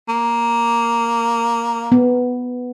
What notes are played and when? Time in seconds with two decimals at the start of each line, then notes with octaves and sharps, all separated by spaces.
0.09 A#3
1.92 B3